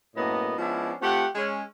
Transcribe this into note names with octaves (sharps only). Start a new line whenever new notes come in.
F#2 A2 A#3 B3 D#5
F3 G#3 B3 C#4 D4 E4
A3 C4 F4 G4 F#5
G#3 C#4